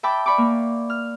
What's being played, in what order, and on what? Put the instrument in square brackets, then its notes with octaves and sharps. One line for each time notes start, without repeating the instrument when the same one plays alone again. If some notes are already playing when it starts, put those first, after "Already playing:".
[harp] E5 G5 A5 B5 D6
D5 B5 C#6 D6
A#3
F6